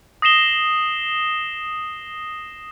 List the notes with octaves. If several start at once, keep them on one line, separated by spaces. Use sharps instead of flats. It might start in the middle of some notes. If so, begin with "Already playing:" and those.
D#6 A#6 C7 E7 G7